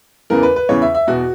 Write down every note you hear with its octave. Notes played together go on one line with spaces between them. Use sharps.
E2 C#3 E3 A#4
B4
B4
E2 C#3 E3 C#5
E5
E5
E2 B2 F#4